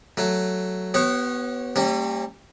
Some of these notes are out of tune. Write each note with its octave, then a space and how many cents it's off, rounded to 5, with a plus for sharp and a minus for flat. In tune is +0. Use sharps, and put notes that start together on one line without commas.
F#3 +5 A3 +0
B3 +0 G4 -45 C#5 -30
G3 +0 A#3 -40 C#4 -40